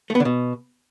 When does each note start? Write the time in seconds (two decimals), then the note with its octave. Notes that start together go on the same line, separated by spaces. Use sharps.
0.10 A3
0.15 B3
0.20 D3
0.25 B2